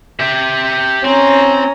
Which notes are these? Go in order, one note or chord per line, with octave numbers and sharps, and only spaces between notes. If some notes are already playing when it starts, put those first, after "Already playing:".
G4 E5
C4 C#4 A#5